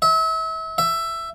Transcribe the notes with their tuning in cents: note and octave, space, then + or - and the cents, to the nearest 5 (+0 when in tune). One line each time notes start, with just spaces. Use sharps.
E5 -35
E5 +10